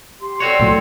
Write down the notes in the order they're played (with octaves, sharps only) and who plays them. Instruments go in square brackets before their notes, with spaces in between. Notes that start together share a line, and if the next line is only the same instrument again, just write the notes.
[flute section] G4 [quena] C6
[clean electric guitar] C4 F#4 C#5 [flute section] A4 D5
[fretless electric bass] C#2 A2 F#3